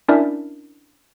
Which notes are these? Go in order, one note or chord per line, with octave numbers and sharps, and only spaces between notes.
C#4 D4 E4 A#4 D5 E5